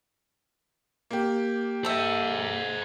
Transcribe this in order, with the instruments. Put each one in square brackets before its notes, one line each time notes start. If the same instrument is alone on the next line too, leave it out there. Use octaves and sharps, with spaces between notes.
[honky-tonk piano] A#3 G4
[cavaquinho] A4 E5 [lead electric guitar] C5 D#5